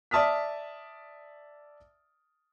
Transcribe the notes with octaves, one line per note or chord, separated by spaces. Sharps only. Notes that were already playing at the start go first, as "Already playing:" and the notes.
D5 E5 A5 D#6 F6 B6